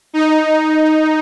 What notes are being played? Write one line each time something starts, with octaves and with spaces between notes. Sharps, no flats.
D#4